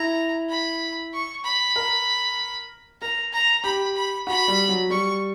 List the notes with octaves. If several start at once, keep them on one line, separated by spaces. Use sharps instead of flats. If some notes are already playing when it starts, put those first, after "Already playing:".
Already playing: E4 A#5
B5
C#6
B5
A#4
A#4 A#5
A#5
G4 B5
B5
F#4 B5
G3
F#3
G3 C#6